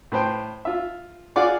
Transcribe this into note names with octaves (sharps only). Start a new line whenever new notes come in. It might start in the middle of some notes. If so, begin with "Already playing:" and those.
A2 B4 C5 G5
F4 E5
F4 G#4 D5 F#5 D6